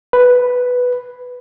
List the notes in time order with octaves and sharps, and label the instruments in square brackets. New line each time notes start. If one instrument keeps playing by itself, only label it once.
[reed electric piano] B4